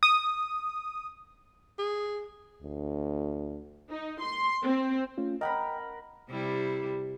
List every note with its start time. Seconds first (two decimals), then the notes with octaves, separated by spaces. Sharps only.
0.03 D#6
1.79 G#4
2.62 D2
3.92 D#4
4.22 C6
4.65 C4
5.18 A3 C#4 F4
5.41 A#4 D#5 F#5 G5 B5
6.30 C3 G3 E4